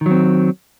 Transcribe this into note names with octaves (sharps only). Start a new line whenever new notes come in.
D#3 F#3 C4